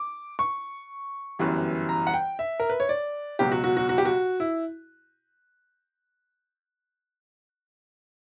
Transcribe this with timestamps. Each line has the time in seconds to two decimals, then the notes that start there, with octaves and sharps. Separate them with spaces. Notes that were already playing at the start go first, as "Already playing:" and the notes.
Already playing: D6
0.39 C#6
1.39 G1 F#2 E3 G3
1.89 A#5
2.07 F#5
2.14 G5
2.39 E5
2.60 A#4
2.69 B4
2.80 C#5
2.89 D5
3.39 C#2 B2 F#3 G4
3.52 F#4
3.64 F#4
3.77 F#4
3.89 F#4
3.98 G4
4.05 F#4
4.40 E4